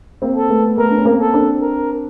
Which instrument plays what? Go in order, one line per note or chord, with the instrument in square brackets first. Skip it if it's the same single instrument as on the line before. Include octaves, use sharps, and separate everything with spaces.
[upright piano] A#3 C4
[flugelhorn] A4
[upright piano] A3 B3
[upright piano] A3 B3 [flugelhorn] A#4
[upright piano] D4
C#4
A#3 C4
[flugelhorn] A4
[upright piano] C4 D4
[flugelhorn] A#4